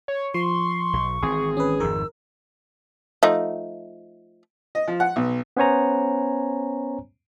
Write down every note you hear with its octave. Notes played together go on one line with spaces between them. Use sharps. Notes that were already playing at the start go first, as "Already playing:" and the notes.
C#5
F3 C6 C#6
B1
G#1 E3 C4 G#4 C6
C#4 B4 D#6
G#1 F2 D#3 A#4 E6
F3 A3 D#4
D#5
F3
F#5
B1
B3 C#4 C5 C#5 G#5 A#5